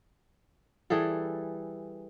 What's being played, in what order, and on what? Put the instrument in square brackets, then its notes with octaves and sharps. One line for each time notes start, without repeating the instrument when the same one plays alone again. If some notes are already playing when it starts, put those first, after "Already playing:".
[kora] E3 G3 G#4 A4